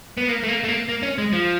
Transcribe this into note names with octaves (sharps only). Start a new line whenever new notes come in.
B3
A#3
A3
A#3
A3
A#3
A#3
C#4
G#3
F3